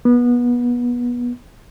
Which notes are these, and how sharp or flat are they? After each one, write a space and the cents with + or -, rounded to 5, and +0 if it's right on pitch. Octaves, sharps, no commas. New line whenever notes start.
B3 -25